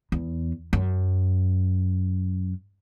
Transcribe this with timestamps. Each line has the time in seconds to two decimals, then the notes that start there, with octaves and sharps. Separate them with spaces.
0.12 E2
0.73 F#2